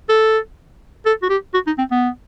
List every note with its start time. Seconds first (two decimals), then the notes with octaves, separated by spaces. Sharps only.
0.09 A4
1.06 A4
1.23 F#4
1.29 G4
1.54 F#4
1.67 D#4
1.78 C4
1.91 B3